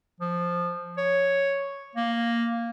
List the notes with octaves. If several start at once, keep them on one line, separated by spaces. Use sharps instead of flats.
F3
C#5
A#3